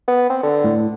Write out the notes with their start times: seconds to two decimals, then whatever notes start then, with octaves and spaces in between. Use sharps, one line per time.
0.07 B3
0.29 C4
0.43 D3
0.64 A2